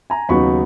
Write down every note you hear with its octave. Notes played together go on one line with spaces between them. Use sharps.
G#5 A#5
D#2 C#3 F#3 B3 D#4 B5 C#6